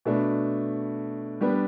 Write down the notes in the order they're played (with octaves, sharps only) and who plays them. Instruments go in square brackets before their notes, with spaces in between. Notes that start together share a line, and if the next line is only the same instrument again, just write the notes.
[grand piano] B2 A3 D4
G3 B3 D4